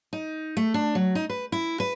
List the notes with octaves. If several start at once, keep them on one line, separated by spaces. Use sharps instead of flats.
D#4
A3
D4
F#3
D#4
B4
E4
B4